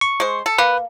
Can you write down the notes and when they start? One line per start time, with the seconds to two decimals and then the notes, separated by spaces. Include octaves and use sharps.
0.01 C#6
0.20 G#3 C5
0.46 A4
0.58 A#3 B4